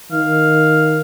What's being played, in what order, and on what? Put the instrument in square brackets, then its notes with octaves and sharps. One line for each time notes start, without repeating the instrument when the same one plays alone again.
[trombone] D#3 [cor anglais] F5